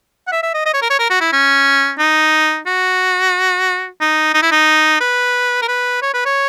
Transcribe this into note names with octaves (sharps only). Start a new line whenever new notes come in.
F#5
E5
E5
D#5
D#5
C#5
A#4
C#5
A#4
F#4
E4
C#4
D#4
F#4
D#4
D#4
E4
D#4
B4
A#4
B4
C#5
B4
C#5